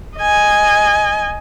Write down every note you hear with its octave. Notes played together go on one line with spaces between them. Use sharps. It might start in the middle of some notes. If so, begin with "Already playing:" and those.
D#5 G#5